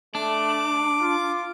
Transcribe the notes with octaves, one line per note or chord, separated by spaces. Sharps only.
A3 D4 D6
F4